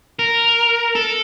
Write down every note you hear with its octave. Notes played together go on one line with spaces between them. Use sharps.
A#4
A4